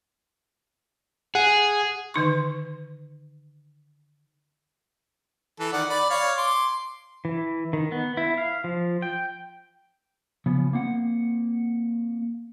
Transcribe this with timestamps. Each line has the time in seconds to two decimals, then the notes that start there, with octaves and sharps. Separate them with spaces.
1.35 G#4 F#5
2.14 D3 D#3 D#4 C#6
5.60 E3 A4
5.73 D#3 D5 F#5
5.90 D5 B5
6.11 C#5 D5 F5
6.37 C6 D6
7.25 E3
7.73 D#3
7.92 B3
8.17 E4
8.38 F5
8.64 F3
9.02 G5
10.46 C#3 F3 B3
10.73 A#3 C4 F#5